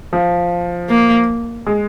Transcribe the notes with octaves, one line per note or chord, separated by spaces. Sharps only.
F3
A#3
G#3